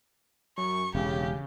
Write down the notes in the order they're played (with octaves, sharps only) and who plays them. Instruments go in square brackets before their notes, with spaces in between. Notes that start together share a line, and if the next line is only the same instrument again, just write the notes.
[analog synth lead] F#2 [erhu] C#6
[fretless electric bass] E1 [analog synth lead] C#3 [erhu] G4